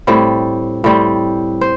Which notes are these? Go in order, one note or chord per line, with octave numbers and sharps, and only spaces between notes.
A2 G3 C4
A2 G3 C4
C5